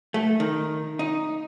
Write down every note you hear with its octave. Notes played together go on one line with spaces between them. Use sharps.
A3
D#3
D#4